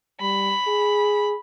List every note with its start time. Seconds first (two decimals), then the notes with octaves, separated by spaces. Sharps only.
0.21 G3 B5
0.67 G#4